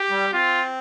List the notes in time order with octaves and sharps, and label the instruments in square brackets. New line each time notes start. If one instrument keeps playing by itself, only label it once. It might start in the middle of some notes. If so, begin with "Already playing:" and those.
Already playing: [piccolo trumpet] G4
[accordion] G3
[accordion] C4 [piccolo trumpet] F4